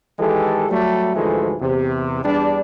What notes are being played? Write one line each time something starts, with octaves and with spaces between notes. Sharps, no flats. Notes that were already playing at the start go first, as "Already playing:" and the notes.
D#3 E3 G#3 G4 A4
F#3 G3 A3
D2 G#2 E3 F3 G#3 A3
E2 C3
E2 G3 D4